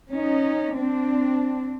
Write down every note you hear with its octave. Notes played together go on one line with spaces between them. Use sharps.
C#4 D#4
C4 D4